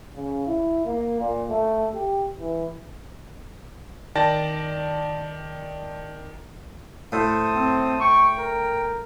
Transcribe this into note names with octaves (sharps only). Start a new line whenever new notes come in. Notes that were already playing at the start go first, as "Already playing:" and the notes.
C#3
E4
A#3
A#2
A3
G4
E3
D#3 D5 G5 A5 A6 A#6
A2 A4 C5 D#6
C4
G5 C#6
A#4